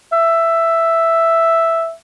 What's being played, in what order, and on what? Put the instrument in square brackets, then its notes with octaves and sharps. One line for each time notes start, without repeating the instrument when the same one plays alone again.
[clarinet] E5